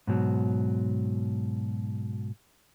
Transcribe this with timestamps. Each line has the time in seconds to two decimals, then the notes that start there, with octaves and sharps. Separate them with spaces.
0.07 G#2 B2 F#3